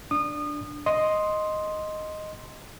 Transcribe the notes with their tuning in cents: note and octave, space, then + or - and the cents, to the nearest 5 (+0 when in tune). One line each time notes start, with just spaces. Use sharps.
D4 +0 D#6 -30
D#5 +0 C6 +0